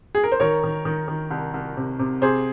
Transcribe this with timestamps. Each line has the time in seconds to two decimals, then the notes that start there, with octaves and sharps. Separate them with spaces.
0.15 G#4
0.24 A#4
0.32 C5
0.40 D#3 A#4 C#5
0.64 D#3
0.85 D#3
1.08 D#3
1.31 C2
1.54 C2
1.77 C3
1.99 C3
2.21 C3 G#4 C5